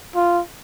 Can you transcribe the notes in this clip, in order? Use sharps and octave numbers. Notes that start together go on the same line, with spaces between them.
F4